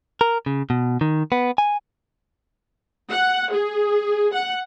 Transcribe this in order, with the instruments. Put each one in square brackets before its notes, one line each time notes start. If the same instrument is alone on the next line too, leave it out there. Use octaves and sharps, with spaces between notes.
[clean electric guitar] A#4
C#3
B2
D#3
B3
G#5
[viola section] F#5
G#4
F#5